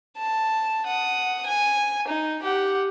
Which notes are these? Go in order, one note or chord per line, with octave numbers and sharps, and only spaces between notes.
A5
F#5 D#6
G#5
D#4
G4 F#5